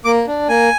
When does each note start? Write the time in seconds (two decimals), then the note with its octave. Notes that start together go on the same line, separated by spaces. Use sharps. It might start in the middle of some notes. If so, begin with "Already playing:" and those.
0.05 A#3 D6
0.27 D4
0.49 A#3 G#5